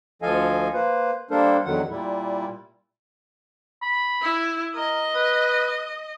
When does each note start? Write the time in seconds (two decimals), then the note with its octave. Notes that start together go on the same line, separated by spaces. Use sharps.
0.22 D2 F3 A4 D#5 F5 G#5
0.74 A#3 B4 C5
1.31 G3 A#3 D4 A4 A#4 C5
1.65 E2 D3 D#3 F#3 F#5
1.90 A#2 G3 E4
3.82 B5
4.22 E4
4.76 A#4 D#5
5.15 B4